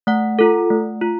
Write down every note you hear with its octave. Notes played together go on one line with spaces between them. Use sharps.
A3 F#5
F4 A4
A3
F4